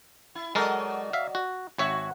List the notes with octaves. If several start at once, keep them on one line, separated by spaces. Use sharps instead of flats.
E4
F#3 G#3 A4 A#4 D5 D#5
E5 F5
F#4
G#1 F#4 C#5 E5